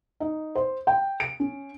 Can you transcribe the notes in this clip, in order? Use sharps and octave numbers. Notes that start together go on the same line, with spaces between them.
D#4
C5
G5
D7
C#4